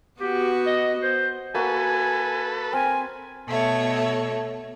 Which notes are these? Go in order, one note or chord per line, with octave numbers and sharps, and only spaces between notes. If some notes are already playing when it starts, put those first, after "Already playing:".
B3 F#4 G4
D#5
C5
A#3 F#4 A4 B4 F#5 G#5
C4 A#4 G#5
B2 A3 C#5